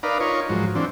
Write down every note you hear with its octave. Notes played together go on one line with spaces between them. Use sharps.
D#4 A#4 B4 D5 F5
D#4 F4 A#4 C#5
G#2 F3 F#3
E3 C4 D4